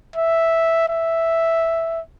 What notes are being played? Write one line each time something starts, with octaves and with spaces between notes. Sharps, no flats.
E5
E5